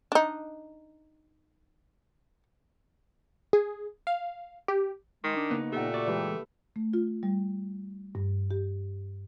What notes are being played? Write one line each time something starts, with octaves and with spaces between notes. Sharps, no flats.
D4 D#4
G#4
F5
G4
D#3 G#3
D4
C#3 A#3 B3 D#4
A#2 A3 G4 F#5
F#4 D5
E3 G#3 G4 A4 B4
A3
F4
G3
G2
G4